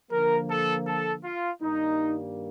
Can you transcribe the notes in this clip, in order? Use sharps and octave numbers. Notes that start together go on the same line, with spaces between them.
D3 F3 A#3 A#4
A4
A4
F4
G2 D#3 G3 A#3 D#4